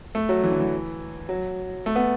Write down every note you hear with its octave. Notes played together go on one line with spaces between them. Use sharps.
A3
F#3
E3
D3
E3
F#3
A3
B3